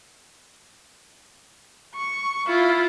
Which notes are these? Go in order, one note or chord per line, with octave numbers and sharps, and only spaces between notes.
C#6
E4 F4